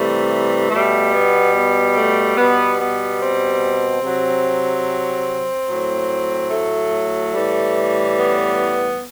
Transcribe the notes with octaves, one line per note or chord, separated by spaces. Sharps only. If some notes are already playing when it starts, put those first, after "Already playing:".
Already playing: C3 E3 G3 A3
B2 G3 A3
B3
B3
A3
B2 G3 B3
B3
C4
C3 F#3
A2 F#3
A3
A2 E3 G3
B3